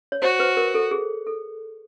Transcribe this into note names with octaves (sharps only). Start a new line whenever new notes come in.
C#5
F#4 C5
B4
A#4
A4
G#4
A4